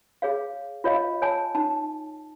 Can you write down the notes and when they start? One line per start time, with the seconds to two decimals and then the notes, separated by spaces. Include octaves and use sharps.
0.22 G#4 C#5 F5
0.84 F4 C#5 D#5 F5
1.22 C#5 G#5 A5
1.55 D#4 A5